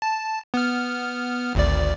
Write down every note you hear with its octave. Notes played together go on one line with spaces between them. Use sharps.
A5
B3 F6
G#1 D2 D5